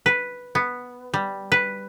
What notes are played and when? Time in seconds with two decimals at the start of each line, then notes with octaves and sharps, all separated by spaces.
0.06 B4
0.55 B3
1.14 G3
1.52 B4